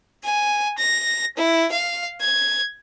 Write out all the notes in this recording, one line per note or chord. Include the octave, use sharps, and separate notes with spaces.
G#5
A#6
E4
F5
G#6